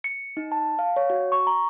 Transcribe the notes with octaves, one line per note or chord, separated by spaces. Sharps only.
C#7
D#4
A5
F5
C#5
F#4
C#6
A#5